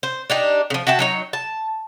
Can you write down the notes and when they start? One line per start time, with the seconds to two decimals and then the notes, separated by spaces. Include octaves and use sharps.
0.03 C5
0.30 D4 D#4 G4
0.70 C#3 F3
0.87 F#4 E5 G5 A5
0.99 F#3 D#4 C#5
1.33 A5